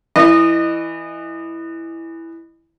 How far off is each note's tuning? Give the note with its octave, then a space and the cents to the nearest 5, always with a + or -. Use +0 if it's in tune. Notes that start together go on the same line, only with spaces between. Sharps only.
E3 +0 D#5 -20